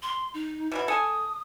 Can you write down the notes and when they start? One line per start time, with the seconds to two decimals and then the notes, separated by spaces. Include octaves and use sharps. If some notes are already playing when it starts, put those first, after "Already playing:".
0.02 C6
0.34 D#4
0.72 B2 E3 E4
0.88 A4 G#5 D#6